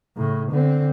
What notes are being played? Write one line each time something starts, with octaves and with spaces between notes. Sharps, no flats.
A2 C#3
D3 C4